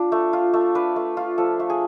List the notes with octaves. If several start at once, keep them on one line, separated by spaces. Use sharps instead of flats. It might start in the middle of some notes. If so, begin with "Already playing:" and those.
Already playing: D4 F4
A3
F4
A3
D4 B4
A3
F4
F3 A4
A3
G#4